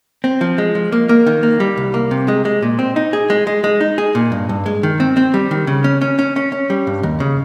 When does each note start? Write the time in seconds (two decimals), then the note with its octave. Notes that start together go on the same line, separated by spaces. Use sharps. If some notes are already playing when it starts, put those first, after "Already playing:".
0.24 C4
0.41 F3
0.58 G#3
0.75 F3
0.92 A#3
1.09 A#3
1.26 D#3
1.43 A#3
1.60 G3
1.77 C2
1.94 A#3
2.11 C3
2.28 G#3
2.45 G#3
2.62 A#2
2.79 C4
2.96 D#4
3.13 G#4
3.30 G#3
3.47 G#3
3.64 G#3
3.81 D#4
3.98 G#4
4.15 A#2
4.32 G2
4.49 G2
4.66 G#3
4.83 D#3
5.00 C4
5.17 C4
5.34 G3
5.51 D#3
5.67 C#3
5.84 C#4
6.01 C#4
6.19 C#4
6.36 C#4
6.52 C#4
6.70 G3
6.87 G2
7.03 D#2
7.20 C#3